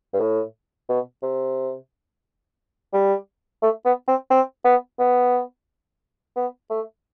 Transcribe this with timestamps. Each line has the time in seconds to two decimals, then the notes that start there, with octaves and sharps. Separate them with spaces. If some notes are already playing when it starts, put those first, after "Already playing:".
0.13 G2
0.20 A2
0.89 B2
1.23 C3
2.93 G3
3.62 A3
3.85 B3
4.08 C4
4.30 C4
4.65 B3
4.99 B3
6.36 B3
6.70 A3